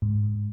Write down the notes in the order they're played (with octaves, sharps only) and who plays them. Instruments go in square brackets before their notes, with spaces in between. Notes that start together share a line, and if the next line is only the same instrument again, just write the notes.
[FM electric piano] G#2